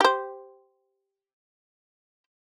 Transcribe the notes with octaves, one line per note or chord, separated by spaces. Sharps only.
G4 C5